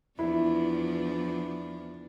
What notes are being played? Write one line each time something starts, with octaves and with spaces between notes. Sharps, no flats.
E2 F3 D4 E4